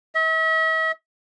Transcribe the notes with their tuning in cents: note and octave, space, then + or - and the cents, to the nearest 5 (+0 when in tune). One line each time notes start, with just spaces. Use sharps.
E5 -45